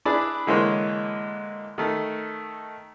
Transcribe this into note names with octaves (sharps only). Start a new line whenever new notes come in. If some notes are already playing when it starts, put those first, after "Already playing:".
D4 E4 G#4 B4 D5
D3 E3 G#3 A#3 C5 C#5
D#3 A3